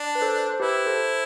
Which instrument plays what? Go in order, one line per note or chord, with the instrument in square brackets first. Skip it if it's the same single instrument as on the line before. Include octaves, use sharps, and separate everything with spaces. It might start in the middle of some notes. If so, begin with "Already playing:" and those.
Already playing: [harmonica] D4
[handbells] B4
A4 C5
C5
[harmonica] E4 [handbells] G4 B4
[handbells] A4 C5